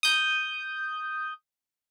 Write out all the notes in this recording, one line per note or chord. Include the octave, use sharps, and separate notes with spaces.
D#6 G6